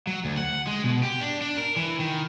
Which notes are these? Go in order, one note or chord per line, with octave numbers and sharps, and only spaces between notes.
F#3
D2
F#5
G#3
B2
G4
D4
D4
A#4
E3
D#3